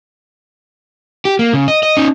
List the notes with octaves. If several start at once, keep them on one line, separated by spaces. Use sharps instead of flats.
G4
A#3
C#3
D#5
D#5
C#4 D#4